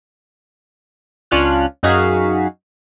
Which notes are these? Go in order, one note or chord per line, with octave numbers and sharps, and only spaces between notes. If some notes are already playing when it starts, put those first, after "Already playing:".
C#2 C#4 D4 F4 F6 F#6
F#2 D#4 F#4 G#4 F5 B6